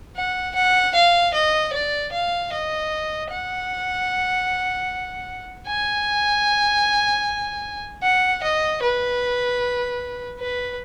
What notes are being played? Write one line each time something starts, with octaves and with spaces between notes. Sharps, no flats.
F#5
F#5
F5
D#5
D5
F5
D#5
F#5
G#5
F#5
D#5
B4
B4